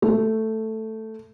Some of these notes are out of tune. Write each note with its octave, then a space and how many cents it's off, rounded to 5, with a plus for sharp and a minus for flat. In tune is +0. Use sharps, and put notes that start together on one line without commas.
A3 +5